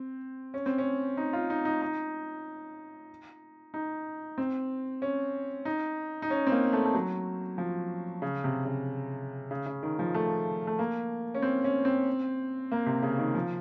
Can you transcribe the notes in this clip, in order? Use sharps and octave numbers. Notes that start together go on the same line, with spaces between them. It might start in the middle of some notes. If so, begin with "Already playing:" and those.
Already playing: C4
C#4
C4
C#4
D#4
F4
D#4
D#4
D#4
D#4
C4
C#4
D#4
D#4
C#4
C4
A#3
A3
A3
F#3
F3
C#3
C3
C#3
C#3
C#3
D#3
F3
A3
A3
A#3
C#4
C4
C#4
C4
A#3
C3
C#3
D#3
F3